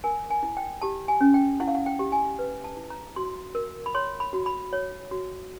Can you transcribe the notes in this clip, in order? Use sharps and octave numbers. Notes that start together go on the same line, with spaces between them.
A#4 G#5
G#5
E4
G5
G4 A5
G#5
C#4
G5
E4 F#5
F5
F#5
G5
G4
G#5
B4
A5
E4
A#5
F#4 C6
A#4
B5
C#5 C6
B5
F#4
B5
C#5
F#4